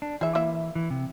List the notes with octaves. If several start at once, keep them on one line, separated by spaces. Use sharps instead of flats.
D4
E3 G#4 E5
A#3 E4 E5
E3
C3